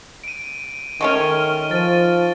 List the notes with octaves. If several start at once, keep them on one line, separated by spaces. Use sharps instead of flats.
D7 D#7
D#3 G#3 A3 C#4 C#6 F6
F3 A6 D#7